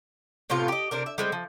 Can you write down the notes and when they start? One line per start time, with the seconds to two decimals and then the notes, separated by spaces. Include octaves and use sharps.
0.50 A2 C3 B3 F4
0.68 G4 D#5
0.91 C3 D4 A#4
1.06 E5
1.18 G3 G#3 A#3 C4
1.32 F3